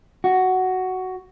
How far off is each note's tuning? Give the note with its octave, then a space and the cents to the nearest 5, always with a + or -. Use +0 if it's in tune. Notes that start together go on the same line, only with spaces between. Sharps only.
F#4 +5